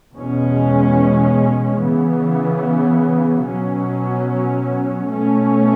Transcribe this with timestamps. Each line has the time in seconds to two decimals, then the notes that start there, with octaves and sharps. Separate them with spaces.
0.14 E2 B2 G#3 C#4
1.79 C#3 E3 B3
3.45 B2 F#3 C#4
5.10 B2 A3 C#4